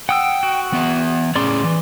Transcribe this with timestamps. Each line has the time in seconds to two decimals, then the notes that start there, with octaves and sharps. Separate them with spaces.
0.09 F#5 G5 D#6 E6
0.43 F#4
0.72 E3 B3 E5
1.36 A2 C#4 G#4 D5 C6 D6
1.64 E3